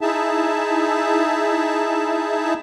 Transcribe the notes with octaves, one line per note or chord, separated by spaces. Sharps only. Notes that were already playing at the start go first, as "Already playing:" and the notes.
D#4 E4 G#4 E5 A5